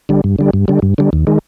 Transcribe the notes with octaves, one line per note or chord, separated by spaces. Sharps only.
D3 G3
G2
D3 G3
G2
D3 G3
G2
D3 G3
D#2
D#3 G#3